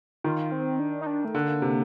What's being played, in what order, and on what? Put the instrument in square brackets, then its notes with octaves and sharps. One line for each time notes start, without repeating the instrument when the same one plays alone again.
[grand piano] D#3 [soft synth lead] F4
[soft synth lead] C4
D4
D#4
D4
A3
[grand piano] D3 [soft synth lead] A#3
[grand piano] C3